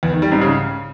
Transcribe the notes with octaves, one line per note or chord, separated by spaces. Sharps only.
E2
D#3
G3
G#2
C#3